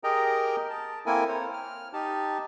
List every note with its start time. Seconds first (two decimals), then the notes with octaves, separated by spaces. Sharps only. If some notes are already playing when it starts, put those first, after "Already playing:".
0.04 G4 G#4 A#4 D#5 G5 A#5
0.70 A5
1.06 A#3 C4 E4 A4 A#4 G#5
1.28 C5 C#5
1.53 F6
1.93 D#4 G4 A5